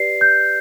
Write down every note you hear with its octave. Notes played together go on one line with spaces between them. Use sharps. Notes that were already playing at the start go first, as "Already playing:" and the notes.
Already playing: G4 B4 D5 C7
G6